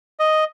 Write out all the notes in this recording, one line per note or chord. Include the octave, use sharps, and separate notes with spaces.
D#5